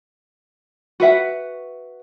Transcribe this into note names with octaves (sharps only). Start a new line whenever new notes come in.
F#4 B4 E5 F#5